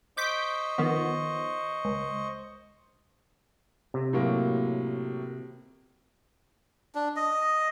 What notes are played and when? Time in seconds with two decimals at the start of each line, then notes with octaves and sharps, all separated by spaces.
0.17 C5 D#5 C#6 D6 G6 B6
0.78 D#3 F3 B3
1.85 C#2
3.94 C3
4.13 A2 F#3 A#3
6.95 D4
7.16 D#5